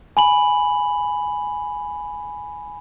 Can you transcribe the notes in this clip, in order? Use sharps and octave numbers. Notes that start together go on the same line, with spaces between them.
G#5 B5 F#7